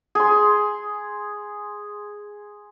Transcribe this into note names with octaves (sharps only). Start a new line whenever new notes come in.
G#4 C6